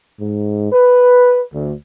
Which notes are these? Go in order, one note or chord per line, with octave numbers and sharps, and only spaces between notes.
G#2
B4
D2